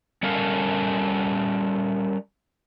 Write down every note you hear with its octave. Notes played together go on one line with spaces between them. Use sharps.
G3 C#4 A4 A#4 F5